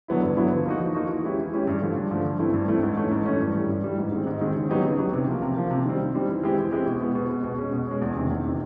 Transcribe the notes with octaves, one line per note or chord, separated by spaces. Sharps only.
D3 F#3 B3 E4
G2
D3 F#3 B3 E4
F3
A#3 D#4 F#4
F3
A#3 D#4 F#4
E3
G#3 C#4 E4 G4
E3
G#3 C#4 E4 G4
G2
D3 F3 A3
G2
D3 F3 A3
G2
E3 A3 C4 E4
G2
E3 A3 C4 E4
G#2
E3 A3 C#4
G#2
E3 A3 C#4
G2
E3 G3
G2
E3 G3
G#2
D#3 G#3 C4
G#2
D#3 G#3 C4
C#3
F#3 B3 D#4 G4
C#3
F#3 B3 D#4 G4
C3
F3 A#3
C3
F3 A#3
C3
D#3 G3 C4
C3
D#3 G3 C4
E3
G#3 C4 E4 G4
E3
G#3 C4 E4 G4
B2
G#3 B3
B2
G#3 B3
B2
G#3 C#4
B2
G#3 C#4
E2
C3 D#3
E2
C3 D#3